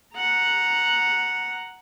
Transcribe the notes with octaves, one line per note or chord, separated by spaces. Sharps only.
F#5 A#5